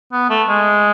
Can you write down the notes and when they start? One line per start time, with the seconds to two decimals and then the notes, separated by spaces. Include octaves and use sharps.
0.12 B3
0.29 A3
0.48 G#3